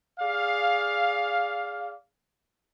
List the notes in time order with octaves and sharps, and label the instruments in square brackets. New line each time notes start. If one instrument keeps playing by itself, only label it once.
[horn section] G#4 D5 F5